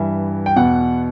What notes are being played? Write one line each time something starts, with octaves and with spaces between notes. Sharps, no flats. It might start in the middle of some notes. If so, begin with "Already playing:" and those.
Already playing: G2 E3 E5
G5
E2 B2 F#5